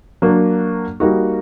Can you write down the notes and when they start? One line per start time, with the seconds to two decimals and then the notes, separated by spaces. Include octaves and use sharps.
0.22 F#3 A#3 D4
1.00 G3 A#3 D#4 F#4